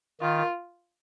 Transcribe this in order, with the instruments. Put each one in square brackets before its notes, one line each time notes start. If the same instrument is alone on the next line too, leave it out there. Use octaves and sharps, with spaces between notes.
[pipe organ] D#3 [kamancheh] F4